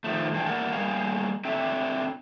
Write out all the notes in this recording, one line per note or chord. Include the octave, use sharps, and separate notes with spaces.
D#3 F3 A3
G2 E3 D4 G#4 G5
E2 G3 A#3 A#4 F#5 A5
G3 A#3 G#4 F5
C4 D4 A4 E5 G5